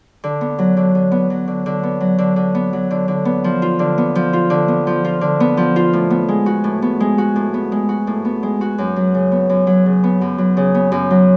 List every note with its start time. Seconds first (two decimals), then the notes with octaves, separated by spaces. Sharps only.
0.24 D3
0.41 B3
0.59 F#3
0.77 D3
0.95 D3
1.12 B3
1.30 F#3
1.48 D3
1.66 D3
1.83 B3
2.01 F#3
2.18 D3
2.36 D3
2.55 B3
2.73 F#3
2.91 D3
3.08 D3
3.25 B3
3.44 F3
3.62 F4
3.79 D3
3.98 B3
4.15 F3
4.33 F4
4.50 D3
4.68 B3
4.87 F3
5.05 F4
5.21 D3
5.40 B3
5.57 F3
5.76 F4
5.93 A2
6.10 B3
6.29 G#3
6.46 F#4
6.64 A2
6.82 B3
7.00 G#3
7.18 F#4
7.36 A2
7.54 B3
7.72 G#3
7.89 F#4
8.07 A2
8.25 B3
8.43 G#3
8.61 F#4
8.78 F#2
8.96 F#3
9.14 C#3
9.32 B3
9.49 F#2
9.67 F#3
9.86 C#3
10.04 B3
10.21 F#2
10.38 F#3
10.57 C#3
10.75 B3
10.92 F#2
11.11 F#3